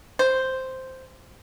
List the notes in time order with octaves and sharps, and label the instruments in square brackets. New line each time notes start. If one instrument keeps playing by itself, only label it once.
[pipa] C5